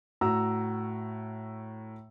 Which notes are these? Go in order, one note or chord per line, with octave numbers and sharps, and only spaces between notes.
A2 F#4 A#5 E6